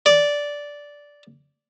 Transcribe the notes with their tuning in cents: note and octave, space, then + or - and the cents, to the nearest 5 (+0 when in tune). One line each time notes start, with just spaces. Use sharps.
D5 -10